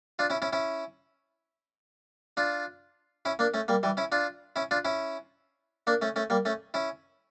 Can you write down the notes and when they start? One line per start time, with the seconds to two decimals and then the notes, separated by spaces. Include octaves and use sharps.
0.19 D4 F4
0.30 C#4 E4
0.42 C#4 E4
0.53 C#4 E4
2.37 D4 F4
3.25 C#4 E4
3.39 A#3 D4
3.54 A3 C#4
3.68 G3 A#3
3.83 E3 G3
3.97 C#4 E4
4.12 D4 F4
4.56 C#4 E4
4.71 D4 F4
4.85 C#4 E4
5.87 A#3 D4
6.02 A3 C#4
6.16 A3 C#4
6.30 G3 A#3
6.45 A3 C#4
6.74 C#4 E4